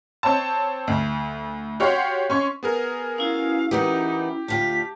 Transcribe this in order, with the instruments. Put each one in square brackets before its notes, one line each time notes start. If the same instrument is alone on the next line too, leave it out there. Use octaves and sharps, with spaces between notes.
[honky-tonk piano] C4 C#5 A5
D2
F#4 G4 C#5 F5 F#5 C6
C#4 C6 C#6
[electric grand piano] B3 G#4 A#4
[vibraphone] C#4 E4 F#4 [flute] F5
[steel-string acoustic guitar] E3 B3 A#4 [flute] D#4 [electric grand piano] G4
[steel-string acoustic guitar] D2 F4 G5 [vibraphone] A5 [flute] B6